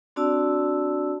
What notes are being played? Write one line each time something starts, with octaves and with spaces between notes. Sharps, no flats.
C4 D4 F#4 D5 A5 E6